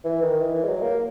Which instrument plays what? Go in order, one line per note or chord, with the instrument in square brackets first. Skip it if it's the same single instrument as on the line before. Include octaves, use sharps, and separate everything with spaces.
[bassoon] E3
D#3
E3
E3
G#3
F#3
A#3